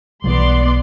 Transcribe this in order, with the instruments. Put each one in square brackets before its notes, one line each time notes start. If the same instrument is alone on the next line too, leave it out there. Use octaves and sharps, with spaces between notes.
[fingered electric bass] B1 E3 G3 [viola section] B3 D5 C6